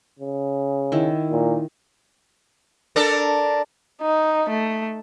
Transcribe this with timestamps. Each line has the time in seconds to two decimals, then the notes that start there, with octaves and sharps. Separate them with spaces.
0.19 C#3
0.92 D#3 E4
1.32 A#2
2.96 D4 A4 A#4
4.01 D#4
4.49 A3